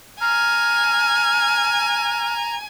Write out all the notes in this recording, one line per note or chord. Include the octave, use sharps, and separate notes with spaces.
G#5 A#5 F6